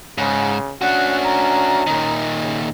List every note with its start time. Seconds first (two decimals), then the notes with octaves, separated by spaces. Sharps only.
0.18 G#2 C#3
0.81 C#4 D4 F#4 F#5
1.24 A#5
1.87 A#2 D#3
2.40 C#3